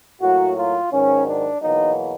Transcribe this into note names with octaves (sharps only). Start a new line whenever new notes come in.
A2 F#3 A#3 F#4
F4
G#2 D#3 F#3 C#4
D4
E2 B2 F#3 A#3 D#4